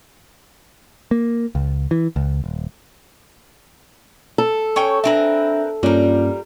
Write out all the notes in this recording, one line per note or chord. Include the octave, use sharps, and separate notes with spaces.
A#3
C#2
E3
C#2
D#1
A4
C#4 C#5 G5
C4 D4 A#4 B4 E5
G2 G3 A#3 C#4 F4 A#4